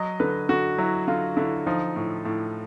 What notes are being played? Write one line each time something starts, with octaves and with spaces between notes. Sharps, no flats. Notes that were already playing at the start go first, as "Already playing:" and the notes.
Already playing: F#3 D#5
D3 B4
D3 F#4
F#3 E4
D3 F4
D3 E4
F3 D#4
A2
A2